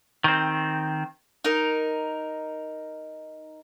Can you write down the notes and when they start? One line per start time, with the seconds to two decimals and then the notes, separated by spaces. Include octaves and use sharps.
0.24 D#3 C4
1.45 D#4 A#4